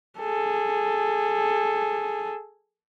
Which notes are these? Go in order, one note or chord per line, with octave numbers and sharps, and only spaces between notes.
G#4 A4